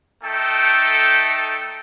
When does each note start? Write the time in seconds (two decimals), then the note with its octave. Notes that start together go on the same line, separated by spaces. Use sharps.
0.24 A3 D#4 A4 G5